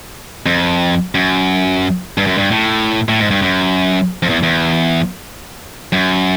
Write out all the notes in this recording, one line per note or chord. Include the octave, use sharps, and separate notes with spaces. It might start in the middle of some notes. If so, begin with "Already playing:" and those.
F2
F#2
G2
F#2
G2
A2
A2
G#2
G2
F#2
F2
E2
E2
F#2